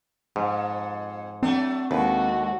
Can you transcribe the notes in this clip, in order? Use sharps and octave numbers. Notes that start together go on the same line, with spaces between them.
F2 G#2
F#3 A3 C4 D4
D#2 G#3 F#4 A4 B4